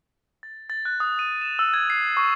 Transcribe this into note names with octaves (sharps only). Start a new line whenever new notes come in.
A6
A6
F#6
D#6
D#7
E7
E6
G#6
C7
C#6